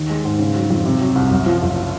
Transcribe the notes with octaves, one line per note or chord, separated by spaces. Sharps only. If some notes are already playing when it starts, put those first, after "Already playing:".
Already playing: D#2 D#3
G#3
G#2
C#3
F#3
F2
C3
F#3
C2
F#2
F3
F#1